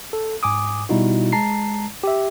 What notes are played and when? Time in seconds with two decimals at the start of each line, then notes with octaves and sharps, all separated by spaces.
0.13 A4
0.43 G#2 G#5 D6 D#6
0.89 B2 G3 D#4 E4 F#4
1.33 G#3 A5 A#5 C7
2.04 G4 E5